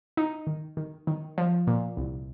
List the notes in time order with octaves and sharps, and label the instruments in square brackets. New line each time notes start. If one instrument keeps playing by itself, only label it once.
[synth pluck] D#4
D#3
D#3
D#3
F3
A#2
C2